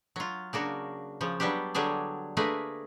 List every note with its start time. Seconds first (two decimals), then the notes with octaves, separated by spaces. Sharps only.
0.16 F#3 F4
0.53 C#3 A#3 D4 F#4
1.21 C#3 F3
1.40 F#3 G3 B3 D4 G4
1.75 D3 F#3 G3 D4 G#4
2.37 A3 A#3 D4 G#4 B4